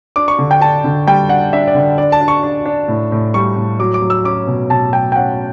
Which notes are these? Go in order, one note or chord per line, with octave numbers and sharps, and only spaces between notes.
D4 D6
C#6
D3
G5
D4 A5
D3
G3 G5
D4 F#5
D4 E5
D5
D3
D4 D5
A5
D4
C#6
D4
D4
A2
A2
G3 C#6
A2
F#3 D6
D6
F#3
E6
C#4 D6
B2
B2 A5
F#3 G5
G5
C#4 F#5